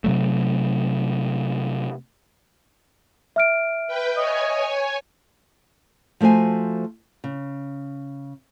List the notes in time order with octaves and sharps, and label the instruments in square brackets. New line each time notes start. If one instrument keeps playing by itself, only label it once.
[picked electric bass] C3 F#3 A3
[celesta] E5 F6 D7
[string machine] B4 G5
[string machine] C#5 G#5 [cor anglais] D#5
[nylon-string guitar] F3 A3 F#4 C5 G#5
C#3